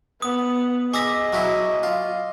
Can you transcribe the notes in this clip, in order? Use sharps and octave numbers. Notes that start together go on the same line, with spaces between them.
B3 D#6
G#4 D#5 B5 D6 E6 A#6
F#3 C#4 E4
F4